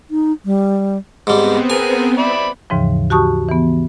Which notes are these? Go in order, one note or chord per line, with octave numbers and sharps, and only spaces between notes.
D#4
G3
G#2 G3 B3 C4
G#4 A#4 G#5
D5 E5 B5
D#2 G#2 C#3 E3 F3
F#4 G4 A5 C#6 D#6
E3 B3